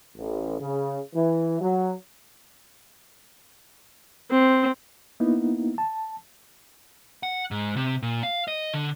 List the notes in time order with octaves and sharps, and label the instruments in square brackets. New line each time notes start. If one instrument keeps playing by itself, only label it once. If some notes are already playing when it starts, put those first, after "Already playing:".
[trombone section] A1
C#3
E3
F#3
[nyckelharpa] C4
[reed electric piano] A#3 B3 D#4 E4
A5
[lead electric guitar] F#5
G#2
C3
A#2
F5
D#5
D3